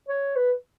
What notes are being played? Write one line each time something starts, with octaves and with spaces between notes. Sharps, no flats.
C#5
B4